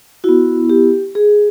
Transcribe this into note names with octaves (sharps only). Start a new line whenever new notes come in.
B3 E4 F#4
G4
G#4